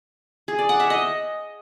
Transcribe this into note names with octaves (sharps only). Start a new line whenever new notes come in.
G#4
D5
F#5
E5
D#5